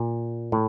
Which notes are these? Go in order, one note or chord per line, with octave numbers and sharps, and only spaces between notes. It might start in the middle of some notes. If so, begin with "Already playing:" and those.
Already playing: A#2
A2